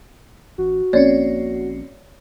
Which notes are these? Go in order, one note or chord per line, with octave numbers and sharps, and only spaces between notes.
A1 F#4
A#1 A#3 C4 C#4 C#5 D5